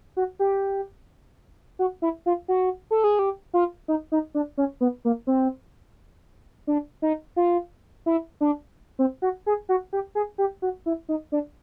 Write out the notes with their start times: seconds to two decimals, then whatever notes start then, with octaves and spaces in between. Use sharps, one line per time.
0.17 F#4
0.39 G4
1.79 F#4
2.02 E4
2.26 F4
2.48 F#4
2.91 A4
3.04 G#4
3.19 G4
3.54 F4
3.88 D#4
4.12 D#4
4.35 D4
4.57 C#4
4.81 B3
5.05 A#3
5.27 C4
6.67 D4
7.02 D#4
7.36 F4
8.06 E4
8.41 D4
8.99 C4
9.22 F#4
9.46 G#4
9.69 F#4
9.93 G4
10.15 G#4
10.38 G4
10.62 F#4
10.86 E4
11.09 D#4
11.32 D4